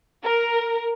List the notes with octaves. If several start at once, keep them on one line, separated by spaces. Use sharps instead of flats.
A#4